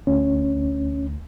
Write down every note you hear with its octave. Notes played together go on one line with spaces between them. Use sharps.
D2 C#4